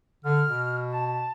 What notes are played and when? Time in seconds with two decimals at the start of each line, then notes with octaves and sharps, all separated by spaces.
0.25 D3 F6
0.47 B2
0.91 A5